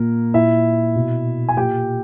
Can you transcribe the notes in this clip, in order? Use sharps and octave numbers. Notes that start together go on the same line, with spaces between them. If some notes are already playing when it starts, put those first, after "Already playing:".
Already playing: A#2 A#3 A#4
A#2 E4 E5
B2
G#5
A#2 G4 G5